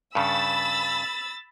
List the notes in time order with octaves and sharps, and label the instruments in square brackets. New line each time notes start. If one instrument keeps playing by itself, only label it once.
[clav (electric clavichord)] G2 C#3 [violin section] B5 E6 A6